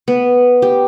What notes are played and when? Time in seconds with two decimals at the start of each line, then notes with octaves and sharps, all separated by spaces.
0.08 B3
0.62 G4